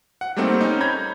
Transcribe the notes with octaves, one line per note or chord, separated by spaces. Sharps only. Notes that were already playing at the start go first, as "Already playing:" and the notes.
F#5
G3 A3 A#3 C4 D#4
C#4 D#4
A#5 B5 G6 G#6